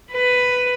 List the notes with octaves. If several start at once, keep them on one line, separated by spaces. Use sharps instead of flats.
B4